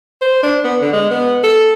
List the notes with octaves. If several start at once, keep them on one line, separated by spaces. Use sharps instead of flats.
C5
D4
B3
D3
G#3
B3
A4